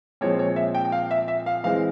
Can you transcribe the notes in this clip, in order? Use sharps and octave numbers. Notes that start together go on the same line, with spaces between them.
A#2 F3 G#3 C4 C#5
C#5
E5
G5
G5
F5
E5
E5
F5
E3 G#3 C4 F5